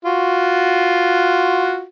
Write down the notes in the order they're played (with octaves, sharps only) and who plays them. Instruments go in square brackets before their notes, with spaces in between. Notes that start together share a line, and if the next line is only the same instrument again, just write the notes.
[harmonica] F4 F#4